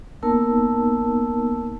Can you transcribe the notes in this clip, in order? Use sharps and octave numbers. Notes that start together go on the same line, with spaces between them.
A#3 B3 D#4 A#4 A5 E6